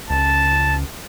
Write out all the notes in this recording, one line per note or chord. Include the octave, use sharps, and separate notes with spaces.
C#2 A5